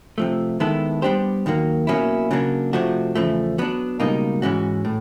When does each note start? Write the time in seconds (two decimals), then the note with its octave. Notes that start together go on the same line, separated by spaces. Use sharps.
0.18 C3 F3 A3
0.60 D#3 G#3 B3 E4 A4
1.02 G3 B3 D4 G4 C5
1.46 D#2 D#3 F#3 A#3
1.87 B2 F#3 A#3 C#4 E4
2.31 C#3 F#3 A#3 D4
2.73 C3 F3 A3 D4 F#4
3.15 E2 C#3 F3 A3
3.58 F#3 B3 D4
4.00 C#2 B2 G3 A#3 D#4
4.42 G#2 E3 G#3 C#4 F#4
4.85 A2